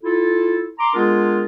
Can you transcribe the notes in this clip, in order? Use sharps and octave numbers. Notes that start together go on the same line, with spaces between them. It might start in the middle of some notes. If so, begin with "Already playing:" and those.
E4 F4 A4
A#5 C6 D6
G#3 B3 D4 F4 G#4 A#4